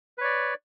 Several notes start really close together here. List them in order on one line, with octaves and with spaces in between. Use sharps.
B4 C#5 D5